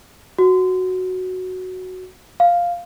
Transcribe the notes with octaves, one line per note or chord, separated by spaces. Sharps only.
F#4
F5